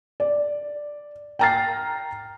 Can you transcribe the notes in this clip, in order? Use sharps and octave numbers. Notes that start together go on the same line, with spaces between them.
D5
G5 A5 A#5 F6 A6 C7